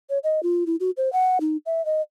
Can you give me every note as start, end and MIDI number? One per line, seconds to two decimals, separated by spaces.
0.10 0.18 73
0.24 0.42 75
0.43 0.64 65
0.67 0.76 64
0.80 0.90 66
0.97 1.11 72
1.13 1.38 78
1.41 1.57 63
1.66 1.85 76
1.85 2.01 75